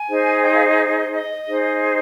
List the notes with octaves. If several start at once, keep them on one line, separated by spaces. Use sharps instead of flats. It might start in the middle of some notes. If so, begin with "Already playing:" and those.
Already playing: G#5
D#4 G#4 C5
G5
F5
D#5
D#5
D#5
D#4 G#4 C5